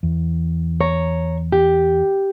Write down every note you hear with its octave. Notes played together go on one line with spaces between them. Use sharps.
E2
C#5 A#5
G4